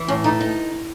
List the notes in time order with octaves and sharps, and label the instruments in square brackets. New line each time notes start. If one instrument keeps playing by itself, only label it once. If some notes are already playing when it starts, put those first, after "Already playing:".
Already playing: [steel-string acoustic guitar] E3
[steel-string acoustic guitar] A2 [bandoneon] C#4
[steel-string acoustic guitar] A3 [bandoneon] D#4
[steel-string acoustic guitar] D#4